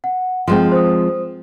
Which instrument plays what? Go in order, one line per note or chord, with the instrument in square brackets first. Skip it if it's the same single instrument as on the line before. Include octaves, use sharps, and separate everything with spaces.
[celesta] F#5
[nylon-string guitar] F3 G#3 C4 [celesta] C6
[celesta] C5 D#6